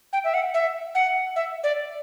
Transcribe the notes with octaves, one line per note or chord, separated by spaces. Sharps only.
G5
E5
F#5
E5
F#5
E5
D5